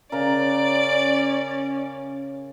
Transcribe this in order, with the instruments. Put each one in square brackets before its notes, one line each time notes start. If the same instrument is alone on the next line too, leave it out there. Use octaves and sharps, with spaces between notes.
[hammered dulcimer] C#3 A#4 [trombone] C#4 [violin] D5